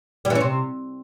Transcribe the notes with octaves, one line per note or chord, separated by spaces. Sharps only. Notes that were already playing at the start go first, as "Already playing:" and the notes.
G3
E3
C#4
C3